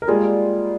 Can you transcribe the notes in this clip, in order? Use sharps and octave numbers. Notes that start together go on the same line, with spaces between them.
A#4
G3 G#3 A#3 F4 G#4